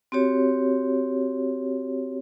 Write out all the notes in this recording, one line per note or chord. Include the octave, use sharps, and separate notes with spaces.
C4 F#4 G4 C#5